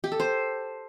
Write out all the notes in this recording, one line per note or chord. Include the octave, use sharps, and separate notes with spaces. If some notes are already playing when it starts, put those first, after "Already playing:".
G4
A4
C5